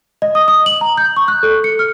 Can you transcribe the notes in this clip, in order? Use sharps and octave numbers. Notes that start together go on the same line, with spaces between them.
D#5
D#6
D#6
F#7
A#5
G6
C#6
F#6
A4
C#7
F6